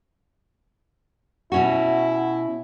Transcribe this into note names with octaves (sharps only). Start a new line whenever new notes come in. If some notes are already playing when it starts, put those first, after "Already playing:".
B2 C#4 E4 F#4